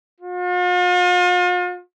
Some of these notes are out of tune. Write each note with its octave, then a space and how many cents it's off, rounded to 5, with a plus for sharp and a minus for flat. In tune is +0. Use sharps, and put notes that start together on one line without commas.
F4 +45